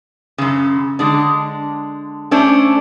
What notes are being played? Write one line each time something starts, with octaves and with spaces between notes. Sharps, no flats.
F#2 C#3
D3 G#3 D4
A3 C#4 D4 C5